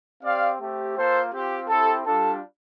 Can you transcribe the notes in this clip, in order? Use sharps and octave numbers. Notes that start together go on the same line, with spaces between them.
C4 G4 D5 F5
A3 C4 G4
A#3 F4 A4 C5
C4 F4 G4
C4 E4 G4 A4
G3 D4 F4 A4